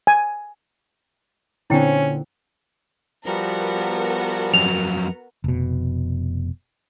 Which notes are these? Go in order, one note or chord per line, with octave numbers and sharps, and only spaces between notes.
G#5
A#2 D3 C4 C#4 E4 G5
F3 G3 B3 F#4 A#4
F2 F#3 F7
F1 B2